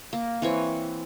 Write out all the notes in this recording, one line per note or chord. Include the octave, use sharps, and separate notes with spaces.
A#3
E3 C4 C#5